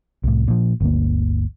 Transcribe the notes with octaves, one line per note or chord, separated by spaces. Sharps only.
C2 A2
A#2 F3
G1 D2 A#3